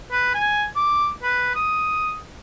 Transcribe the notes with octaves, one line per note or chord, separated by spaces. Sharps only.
B4
G#5
D6
B4
D#6